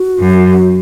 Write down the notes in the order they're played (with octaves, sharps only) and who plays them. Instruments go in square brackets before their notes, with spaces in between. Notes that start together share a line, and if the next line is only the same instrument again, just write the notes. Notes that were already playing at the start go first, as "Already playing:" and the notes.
Already playing: [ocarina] F#4
[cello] F#2